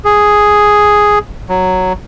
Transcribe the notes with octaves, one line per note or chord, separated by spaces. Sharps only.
G#4
F#3